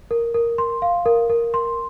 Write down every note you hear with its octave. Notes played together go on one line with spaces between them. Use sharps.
A#4
A#4
C6
F5
A#4
A#4
C6